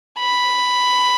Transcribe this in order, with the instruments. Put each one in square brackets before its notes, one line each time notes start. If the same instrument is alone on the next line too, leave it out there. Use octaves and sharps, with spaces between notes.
[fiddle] B5